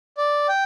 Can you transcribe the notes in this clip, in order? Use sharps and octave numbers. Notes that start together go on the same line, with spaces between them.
D5
G5